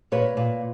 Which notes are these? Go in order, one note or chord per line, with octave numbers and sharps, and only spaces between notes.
A#2 B4 C#5
A#2